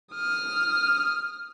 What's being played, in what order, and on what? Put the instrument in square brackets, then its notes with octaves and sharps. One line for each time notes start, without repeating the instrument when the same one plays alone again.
[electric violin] D#6 F6